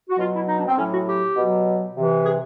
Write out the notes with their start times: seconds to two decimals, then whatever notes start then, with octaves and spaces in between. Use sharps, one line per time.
0.09 F#4
0.17 B2 F#3 F4
0.33 E4
0.48 D#4
0.57 D4
0.67 C4
0.77 A2 F#3 C#4
0.92 F#4
1.06 G4
1.36 B2 F#3
1.95 C3 E3
2.24 G#4